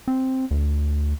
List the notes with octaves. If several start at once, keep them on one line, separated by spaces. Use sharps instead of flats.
C4
D2